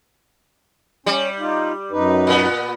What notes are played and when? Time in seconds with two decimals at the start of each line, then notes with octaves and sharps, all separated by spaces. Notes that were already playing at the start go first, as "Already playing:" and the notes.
1.06 G3 C#4
1.39 D#4 F4
1.91 F#2 D#4 B4
2.27 A#2 B3